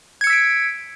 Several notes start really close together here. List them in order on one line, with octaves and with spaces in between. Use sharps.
G#6 C#7 E6 B6 D7